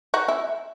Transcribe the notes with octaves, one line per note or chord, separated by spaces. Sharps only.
D#4 F#4
E4